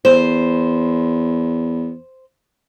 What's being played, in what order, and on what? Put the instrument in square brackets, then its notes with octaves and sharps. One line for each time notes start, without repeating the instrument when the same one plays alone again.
[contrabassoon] E2 [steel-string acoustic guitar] C5